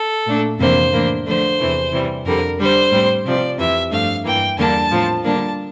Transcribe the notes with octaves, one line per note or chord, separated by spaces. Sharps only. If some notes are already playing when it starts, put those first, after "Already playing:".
Already playing: A4
A#2 A3 D4
F2 C3 E3 A#3 D4 C5
A2 E3 A#3 D4
D3 F3 A3 D4 C5
E2 C3 E3 A3
C3 E3 G3
F2 D3 G3 A#4
D3 G3 D4 C5
A2 G3 C4
C3 F3 C4 D5
F2 C3 E3 E5
G2 F3 A3 D4 F5
G2 E3 A#3 G5
E2 D3 G3 A#3 D4 A5
A2 F3 C4
D3 G3 A#3 D4 A5